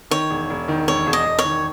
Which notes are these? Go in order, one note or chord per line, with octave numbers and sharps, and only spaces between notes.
D#3 C#5
E1
E1
D#3
E1 C#5
E1
D#5
E1
C#5
D#3